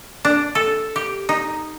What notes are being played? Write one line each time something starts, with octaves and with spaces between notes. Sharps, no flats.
D4
A4
G4
D#4